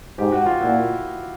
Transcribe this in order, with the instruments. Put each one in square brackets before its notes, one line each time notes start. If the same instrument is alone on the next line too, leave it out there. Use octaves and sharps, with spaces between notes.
[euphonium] G#2 [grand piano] G4
[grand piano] F#4
F4
[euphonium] A#2 [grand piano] E4 F#4